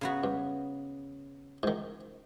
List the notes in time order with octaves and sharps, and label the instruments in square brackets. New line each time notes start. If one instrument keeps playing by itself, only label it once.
[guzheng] C#3 B3 F#4
[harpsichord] G2
G#2 D#3